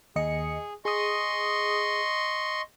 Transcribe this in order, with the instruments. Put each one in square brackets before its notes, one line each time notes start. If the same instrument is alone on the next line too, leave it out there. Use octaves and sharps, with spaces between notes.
[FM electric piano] D#2 D#5 C#7 [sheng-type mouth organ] G#4
[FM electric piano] G#4 D#6 [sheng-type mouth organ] D#5 C6 C#6